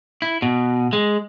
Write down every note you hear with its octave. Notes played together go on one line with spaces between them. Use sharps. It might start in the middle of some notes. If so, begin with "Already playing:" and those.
E4
B2
G#3